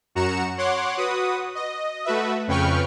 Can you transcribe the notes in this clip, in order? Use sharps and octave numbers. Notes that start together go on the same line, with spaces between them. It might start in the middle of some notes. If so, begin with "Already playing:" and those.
F#2 F#4 A#5 C#7 E7
C#5 F#5 C6 D6
F#4 B4 D#6
D#5
A3 F#4 B4 E5
F2 C#3 B4 G5 C#6 F6